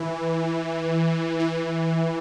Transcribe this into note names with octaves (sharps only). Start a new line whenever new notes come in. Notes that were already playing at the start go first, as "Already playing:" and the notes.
Already playing: E3
E3